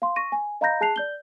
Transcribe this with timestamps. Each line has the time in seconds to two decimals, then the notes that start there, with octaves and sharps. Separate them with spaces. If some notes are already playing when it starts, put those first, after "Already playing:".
0.02 F5 C6
0.16 C#6 A#6 D#7
0.32 G#5
0.61 D#5 F5 A#5 B5 G6 A#6
0.81 G#4 A5 F#6 C7 F7
0.96 D5 G6 G7